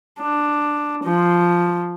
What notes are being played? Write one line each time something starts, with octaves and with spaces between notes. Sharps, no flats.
D4
F3